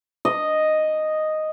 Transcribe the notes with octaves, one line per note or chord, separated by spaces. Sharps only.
D#5